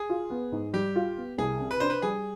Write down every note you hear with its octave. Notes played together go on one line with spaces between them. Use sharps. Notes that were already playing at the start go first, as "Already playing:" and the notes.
Already playing: G#4
F4
B3
G#2
G3 G4
F4
B3
C2 G#4
C3
B4
D4 C5
B4
G3 G#4